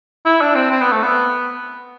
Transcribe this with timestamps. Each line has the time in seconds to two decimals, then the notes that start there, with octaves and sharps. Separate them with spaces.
0.26 E4
0.41 D4
0.55 C4
0.71 C4
0.81 B3
0.92 A3
1.03 B3